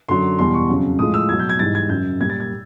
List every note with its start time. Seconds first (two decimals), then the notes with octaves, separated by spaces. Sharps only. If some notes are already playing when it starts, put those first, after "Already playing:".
0.08 F#2 D3 F#3 C6
0.39 E2 B2 G3 C6
0.54 C#6
0.69 F2 C#3 F#3
0.98 A2 F3 G#3 D#6
1.14 E6
1.29 B2 F#3 G#6
1.39 G6
1.49 G#6
1.59 G#2 E3 G3 A6
1.75 G#6
1.89 F#2 C#3 F#3 G6
2.20 A#2 G3 G#6
2.30 A6
2.40 G#6